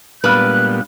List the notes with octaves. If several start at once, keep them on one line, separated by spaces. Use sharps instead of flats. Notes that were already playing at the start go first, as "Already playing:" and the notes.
A#2 G3 G#3 B3 D4 B4 F5 F#6